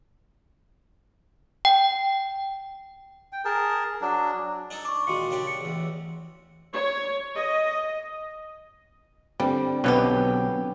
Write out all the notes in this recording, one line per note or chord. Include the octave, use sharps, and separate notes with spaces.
G5
G5
G#4 A#4 A5
F#3 D4
D4 D#4 A4
D4 C#6 D6
A#2 D#3 G#3 F#4 C6 C#7
C#3 D4 G4
C#7
A1 E2
C#5
D#5
D3 G3 C4 D4
B1 B2 B3 C#4 G4 G#5